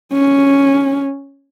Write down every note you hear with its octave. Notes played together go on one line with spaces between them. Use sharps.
C#4